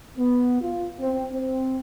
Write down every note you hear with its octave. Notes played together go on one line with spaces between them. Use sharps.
B3
F4
C4
C4